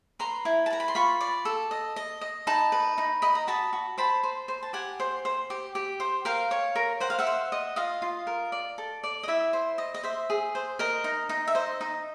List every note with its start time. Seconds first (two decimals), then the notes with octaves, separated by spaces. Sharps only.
0.19 B4 A#5 C6
0.45 E4
0.66 A5
0.70 B4 A#5
0.80 B5
0.88 C6
0.95 F4 B5 C#6
1.21 D5
1.45 A4
1.71 D#5
1.96 D#5
2.21 D#5
2.47 D#4 A5 B5
2.72 B4
2.98 D#4
3.22 D#5 B5
3.35 A#5
3.47 F#4 A5 B5
3.73 F#4
3.98 C5 A5 B5
4.23 C5
4.48 C5
4.63 A5
4.73 G4 F#5 G#5
5.00 C5
5.25 C5
5.50 G4
5.75 G4
6.00 C5
6.25 A#4 F5 G5
6.51 C#5
6.75 A#4
7.00 C5 F#5
7.10 F5
7.19 E5 F#5
7.27 C5
7.52 D#5
7.76 F4 D#5 F5
8.02 F4
8.27 A#4
8.52 D5
8.78 A4
9.03 D5
9.23 D#5
9.28 E4 E5
9.53 C5
9.78 D#5
9.94 D#5
10.03 C5 E5
10.30 G#4
10.55 C5
10.79 A#4 D#5
11.04 D#4
11.29 D#4
11.47 E5
11.55 C5 D#5
11.81 D#4